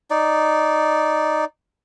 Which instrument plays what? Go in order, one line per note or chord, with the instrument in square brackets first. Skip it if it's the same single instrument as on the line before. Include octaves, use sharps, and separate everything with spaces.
[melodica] D#4 D5